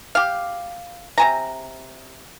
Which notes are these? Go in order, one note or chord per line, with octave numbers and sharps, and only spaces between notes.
G4 F5
C3 G#5 A#5